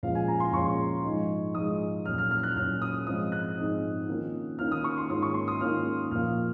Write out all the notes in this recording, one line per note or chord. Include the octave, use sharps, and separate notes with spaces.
A#2 F3 G#3 C#4 F4 F5
G#5
A#5
C6
A#2 F3 G#3 C#4 F4 C#6
G#2 F3 G#3 D#4
G#2 F3 G#3 D#4 D#6
A#2 F#3 C#4 F6
F6
F6
F#6
A#2 F#3 C#4 F6
D#6
G#2 F3 G#3 C4 D#4 D#6
F#6
G#2 F3 G#3 C4 D#4
D#3 A#3 C#4 F4
D#3 A#3 C#4 F4 F6
D#6
C#6
C6
G#2 D#3 A#3 C#4 F4 D#6
C#6
C6
D#6
G#2 D#3 A#3 C#4 F4 F6
A#2 F3 A#3 F4 F6